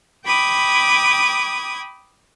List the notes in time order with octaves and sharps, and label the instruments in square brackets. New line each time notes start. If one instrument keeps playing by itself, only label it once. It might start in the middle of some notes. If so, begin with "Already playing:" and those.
[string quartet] G5 B5 D6 D#6 G#6